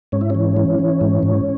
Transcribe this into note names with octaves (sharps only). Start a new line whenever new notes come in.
G#2 C#4
E4
E3 C#4
E3
E3
G#2
G#2